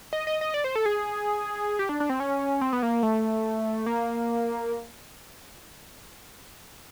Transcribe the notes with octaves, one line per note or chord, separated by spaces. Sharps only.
D#5
D#5
D#5
D5
C5
A4
G#4
G4
D4
D4
C4
C#4
C4
B3
A#3
A3
A#3